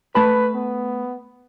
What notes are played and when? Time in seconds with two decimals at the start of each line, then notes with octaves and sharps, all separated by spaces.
0.15 A3 B4 A5 B5
0.55 B3